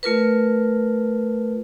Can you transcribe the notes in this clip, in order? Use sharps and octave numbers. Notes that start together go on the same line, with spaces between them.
A3 F4 A#4 B4